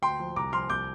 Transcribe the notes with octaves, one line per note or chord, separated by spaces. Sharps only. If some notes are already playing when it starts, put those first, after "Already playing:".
D2 G5 C6
F3
C2 A#5 D6
F3 C6 F6
C2 D6 G6